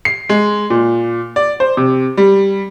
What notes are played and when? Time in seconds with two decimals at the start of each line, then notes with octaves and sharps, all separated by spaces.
0.05 C7
0.29 G#3
0.70 A#2
1.36 D5
1.60 C5
1.77 C3
2.17 G3